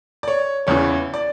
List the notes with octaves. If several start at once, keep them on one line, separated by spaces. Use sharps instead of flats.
D5
C#5
E2 C#3 E3 C#5
D5